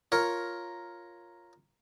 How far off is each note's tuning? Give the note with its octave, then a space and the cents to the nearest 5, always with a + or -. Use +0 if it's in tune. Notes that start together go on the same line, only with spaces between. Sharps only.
F4 +0 A#4 +0 C#5 +0